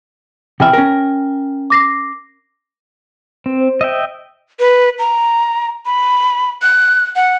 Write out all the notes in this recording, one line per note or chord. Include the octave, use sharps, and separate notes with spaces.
C3 E3 E5 G5 G#5 F6
C#4 A#4
D6 A#6 C7
C4 B4
C5
D#5 E5 G5
B4
A#5
B5
F#6
F#5